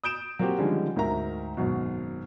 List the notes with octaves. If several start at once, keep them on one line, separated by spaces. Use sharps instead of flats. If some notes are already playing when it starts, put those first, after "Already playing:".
D#6 G6 D7 E7
F#3 A#3 C4 F#4 G4
D3 D#3 F3 G3 G#3 C#4
D2 G#2 A#4 E5 A#5
G#1 F#2 B2